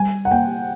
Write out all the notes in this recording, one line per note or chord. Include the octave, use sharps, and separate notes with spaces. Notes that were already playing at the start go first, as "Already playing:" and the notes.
Already playing: G3 G#5
F#5
A#3 G5